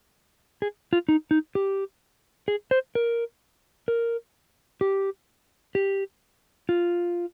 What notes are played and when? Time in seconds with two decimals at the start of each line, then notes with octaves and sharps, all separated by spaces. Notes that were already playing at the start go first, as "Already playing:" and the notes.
0.62 G#4
0.93 F4
1.09 D#4
1.31 D#4
1.55 G4
2.48 G#4
2.71 C5
2.95 A#4
3.88 A#4
4.81 G4
5.75 G4
6.69 F4